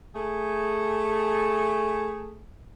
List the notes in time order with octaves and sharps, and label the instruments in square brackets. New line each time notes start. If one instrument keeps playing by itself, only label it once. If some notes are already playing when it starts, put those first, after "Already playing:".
[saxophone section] A3 G#4